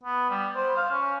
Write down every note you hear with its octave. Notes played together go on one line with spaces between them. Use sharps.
B3
G3
C5
F5
C#4